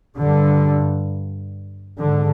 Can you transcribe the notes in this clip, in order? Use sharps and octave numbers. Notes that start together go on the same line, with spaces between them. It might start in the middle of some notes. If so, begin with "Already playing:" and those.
G2 D3
G#2 D3